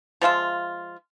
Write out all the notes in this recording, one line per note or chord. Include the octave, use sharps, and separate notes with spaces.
F3 G#3 F4 E5